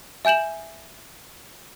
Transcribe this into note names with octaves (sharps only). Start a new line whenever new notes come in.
E5 G#5 G6 E7 F#7